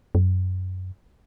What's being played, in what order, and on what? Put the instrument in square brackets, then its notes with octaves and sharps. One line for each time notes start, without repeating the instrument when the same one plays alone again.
[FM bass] F#2